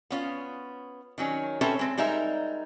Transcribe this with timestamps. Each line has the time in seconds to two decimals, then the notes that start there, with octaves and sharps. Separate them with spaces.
0.10 B3 C#4 F4
1.18 D#3 F#3 C#4
1.61 C4 C#4 A4 B4 C#5 E5
1.79 G#3 C4
1.97 G3 G#3 D#4 A#4 E5